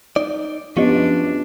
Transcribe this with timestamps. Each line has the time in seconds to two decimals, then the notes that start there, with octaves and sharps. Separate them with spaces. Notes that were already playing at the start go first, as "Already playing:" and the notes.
0.16 D#4 D5
0.77 F#2 F3 B3 C#4 D4 F4 G4 D#5